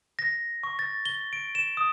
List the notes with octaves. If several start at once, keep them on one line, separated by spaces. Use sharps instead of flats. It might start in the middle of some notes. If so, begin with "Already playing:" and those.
A#6
C#6
A6
G7
D7
E7
D#6